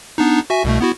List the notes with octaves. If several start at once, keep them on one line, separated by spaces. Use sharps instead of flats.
B3 D4 D#4
F#4 E5 G#5
C2 B2 A3
B3 E4 F#4